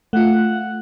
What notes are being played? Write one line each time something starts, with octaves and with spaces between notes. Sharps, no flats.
A3 F4 F#5